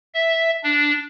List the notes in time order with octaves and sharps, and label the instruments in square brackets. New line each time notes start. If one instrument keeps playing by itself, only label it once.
[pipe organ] E5
D4